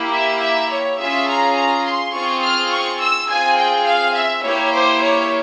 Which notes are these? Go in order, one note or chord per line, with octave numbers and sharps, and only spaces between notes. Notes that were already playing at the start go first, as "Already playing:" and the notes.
Already playing: A#3 E4 G4
E5
E5
C#5
C#4 F4 G#4 E5
A#5
A#5
C6
C4 F4 G#4 C#6
F6
C#6
E6
C4 F4 G#4 G#5
G5
F5
E5
A#3 E4 G4 C#5
C5
C#5